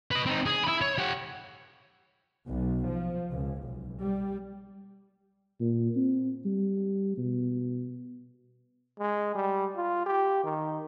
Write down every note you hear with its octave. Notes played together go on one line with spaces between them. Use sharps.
B4 D#5
C4 D#4
G#4
E4 B5
C#5
G4 F#5
B1
F3
C#2
B1
G3
A#2
C4
G3
B2
G#3
G3
F4
G4
D#3